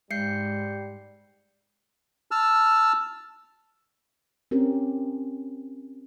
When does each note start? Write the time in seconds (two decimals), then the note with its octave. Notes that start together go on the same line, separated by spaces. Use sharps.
0.11 G#2 G3 G#3 G6 C7 C#7
2.31 A5 E6 F6
4.51 C4 C#4 G4 A#4